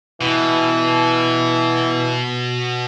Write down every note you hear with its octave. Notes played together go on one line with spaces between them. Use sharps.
B2 E3